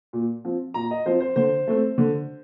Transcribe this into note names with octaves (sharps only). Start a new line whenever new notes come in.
A#2
F3 C4
A#2 A#5
D#5
F3 C4 C5
C5
D3 C5
A3 C4
D3